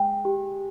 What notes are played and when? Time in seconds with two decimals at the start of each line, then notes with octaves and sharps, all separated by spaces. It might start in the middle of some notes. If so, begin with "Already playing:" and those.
Already playing: G#3 G5
0.25 G4